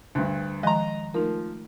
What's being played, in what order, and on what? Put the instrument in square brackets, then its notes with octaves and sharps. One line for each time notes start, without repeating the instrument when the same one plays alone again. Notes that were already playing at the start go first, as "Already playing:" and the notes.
[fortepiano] D2 G2
[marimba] D#3 F3 G#3 [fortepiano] D#5 A#5
[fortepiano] F3 [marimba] A3 D#4 A#4